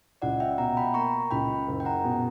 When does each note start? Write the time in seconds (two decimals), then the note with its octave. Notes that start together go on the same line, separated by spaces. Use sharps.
0.22 C#2 D5 F#5
0.40 E5 G5
0.58 B2 F#5 A#5
0.77 G5 B5
0.94 A#3 A#5 C#6
1.31 C#2 G5 B5
1.67 F#1
1.80 G5
1.85 F#5 A#5
2.04 B2